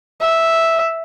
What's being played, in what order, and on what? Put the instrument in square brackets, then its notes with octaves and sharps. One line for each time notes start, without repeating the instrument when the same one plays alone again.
[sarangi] E5